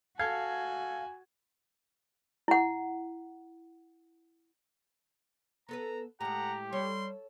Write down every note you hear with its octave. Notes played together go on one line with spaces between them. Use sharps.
F#4 A4 F5 G#5 G#6
E4 F#5
B3 A4 B4 A#5
A2 G#3 G4 F#5 A#5
G3 A4 C#5 C6